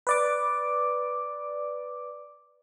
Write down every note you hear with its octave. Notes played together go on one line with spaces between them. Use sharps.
B4 D5 D6